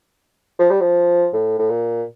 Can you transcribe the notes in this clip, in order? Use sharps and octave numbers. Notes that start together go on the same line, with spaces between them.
F3
G3
F3
A2
A2
A#2